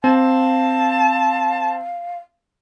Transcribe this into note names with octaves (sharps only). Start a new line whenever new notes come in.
C4 F5 A5